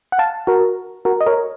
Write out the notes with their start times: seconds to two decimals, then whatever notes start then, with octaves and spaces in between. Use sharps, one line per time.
0.12 F#5
0.19 F5 A5
0.47 F#4 A#4
1.05 F#4 A#4
1.21 D#5
1.26 A#4 C#5